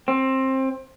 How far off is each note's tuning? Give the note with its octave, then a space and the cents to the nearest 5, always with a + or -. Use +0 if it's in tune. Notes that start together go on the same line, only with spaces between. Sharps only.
C4 +20